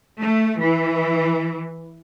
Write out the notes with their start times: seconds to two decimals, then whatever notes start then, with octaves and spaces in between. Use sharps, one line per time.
0.19 A3
0.59 E3